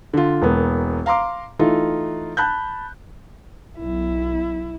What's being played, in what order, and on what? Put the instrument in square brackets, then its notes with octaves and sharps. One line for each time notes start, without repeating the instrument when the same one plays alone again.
[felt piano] D3 F4
E1 A#3 B3
F5 A#5 C6 D6
E3 A3 D#4 F4
A5 B5 F#6 G6
[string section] B1 [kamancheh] E4